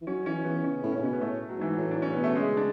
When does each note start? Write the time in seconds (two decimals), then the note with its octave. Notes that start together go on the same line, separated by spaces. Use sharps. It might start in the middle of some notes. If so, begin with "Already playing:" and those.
0.02 E3
0.07 F#3 C#4
0.26 E3 C#4
0.44 E3 B3
0.64 C#3 C#4
0.83 A2
0.92 C#4
0.96 C#3
1.02 B2 C#4
1.13 B3
1.21 A2 A3
1.49 F#3
1.59 G#2 E3
1.73 A2 F#3
1.91 D4
1.97 A2
2.02 C#4
2.13 B2 B3
2.24 A3
2.35 C#3 G#3
2.57 D4